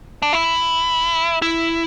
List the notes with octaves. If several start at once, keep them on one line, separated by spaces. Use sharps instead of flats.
D4
E4
E4